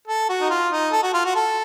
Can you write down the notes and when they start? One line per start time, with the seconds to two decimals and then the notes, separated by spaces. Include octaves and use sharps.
0.08 A4
0.29 F#4
0.41 D#4
0.50 F4
0.72 D#4
0.92 A4
1.03 F#4
1.14 F4
1.25 F#4
1.35 A4